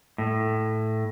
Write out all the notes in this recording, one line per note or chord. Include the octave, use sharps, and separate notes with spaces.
A2